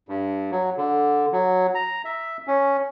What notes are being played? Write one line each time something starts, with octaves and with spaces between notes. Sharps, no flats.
G2
F#3
D3
F#3
A#5
E5
C#4